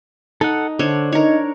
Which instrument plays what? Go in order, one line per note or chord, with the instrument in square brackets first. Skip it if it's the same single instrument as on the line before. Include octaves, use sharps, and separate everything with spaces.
[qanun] D#4 [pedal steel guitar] A4 F#5
[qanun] D3 C5 C#5 [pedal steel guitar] D4
[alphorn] D#4 [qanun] A#4 C#5